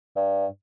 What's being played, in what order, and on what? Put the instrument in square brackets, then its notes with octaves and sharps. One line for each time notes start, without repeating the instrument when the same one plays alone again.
[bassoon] G2